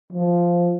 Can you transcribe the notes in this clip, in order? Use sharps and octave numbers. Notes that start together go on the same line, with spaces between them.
F3